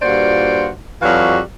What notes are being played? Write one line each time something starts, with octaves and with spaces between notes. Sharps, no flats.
G2 A#2 F4 F#4 C5 D5
F2 E3 F#3 G3 F#4 F5